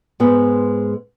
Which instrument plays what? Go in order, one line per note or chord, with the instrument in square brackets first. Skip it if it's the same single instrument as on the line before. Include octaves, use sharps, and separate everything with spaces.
[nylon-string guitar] G#2 G#3 B3